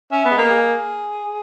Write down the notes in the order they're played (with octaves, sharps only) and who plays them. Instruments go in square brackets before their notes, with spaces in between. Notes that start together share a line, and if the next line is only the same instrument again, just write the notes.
[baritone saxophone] C#4 [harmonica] E5
[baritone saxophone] B3
[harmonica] G#4 B4 D#5
[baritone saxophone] A#3
[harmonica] G#4